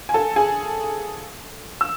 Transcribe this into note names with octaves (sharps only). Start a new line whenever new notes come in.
G#5
A4 A5
G#4 G#5
E6